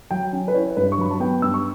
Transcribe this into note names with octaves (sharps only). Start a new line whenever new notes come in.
F#3 G5
C#4
B4
E4 C#5
G2 B4
C#6
F#3 B5
A5
B3 G5
G2 E6
C#6